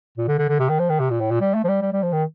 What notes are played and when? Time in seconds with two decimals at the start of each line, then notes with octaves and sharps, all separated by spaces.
0.18 A#2
0.28 D3
0.39 D3
0.49 D3
0.59 C3
0.69 D#3
0.79 F3
0.90 D#3
1.00 C3
1.10 A#2
1.21 A2
1.31 A#2
1.41 G3
1.55 A3
1.65 F3
1.68 G3
1.82 G3
1.93 G3
2.03 F3
2.13 D#3